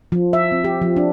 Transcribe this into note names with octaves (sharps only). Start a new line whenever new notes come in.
F3
E5
C4
G4
F3
D4